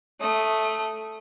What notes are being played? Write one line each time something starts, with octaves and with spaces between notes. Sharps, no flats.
A3 D#6